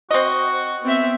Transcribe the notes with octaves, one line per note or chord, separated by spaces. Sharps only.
C4 F#4 D#5
B3 C4 E5